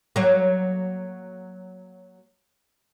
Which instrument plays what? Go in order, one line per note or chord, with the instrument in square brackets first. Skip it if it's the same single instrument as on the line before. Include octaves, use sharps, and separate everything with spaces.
[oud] F#3 A#3